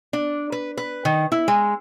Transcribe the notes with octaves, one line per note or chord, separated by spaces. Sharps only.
D4
B4
B4
D#3
E4
G#3